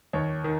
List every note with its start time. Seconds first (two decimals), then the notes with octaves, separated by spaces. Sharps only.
0.13 D#2 C#5
0.44 D#3